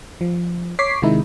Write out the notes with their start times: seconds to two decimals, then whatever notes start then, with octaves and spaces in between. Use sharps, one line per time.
0.21 F3
0.79 C#5 D6 B6 C7
1.02 C3 D#3 G#3 D#4 E4